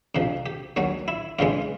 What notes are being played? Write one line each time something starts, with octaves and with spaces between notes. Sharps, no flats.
F2 C3 F3
G4
D#2 D#3 F#3 F#4
E4
F2 C#3 E3 G#3 F4